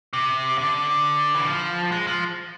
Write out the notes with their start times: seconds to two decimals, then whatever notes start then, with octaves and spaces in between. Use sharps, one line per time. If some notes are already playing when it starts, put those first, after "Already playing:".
0.13 C3
0.58 D3
1.35 E3
1.47 F3
1.92 G#3
2.07 F3